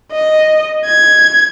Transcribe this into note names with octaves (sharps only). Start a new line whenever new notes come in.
D#5
G#6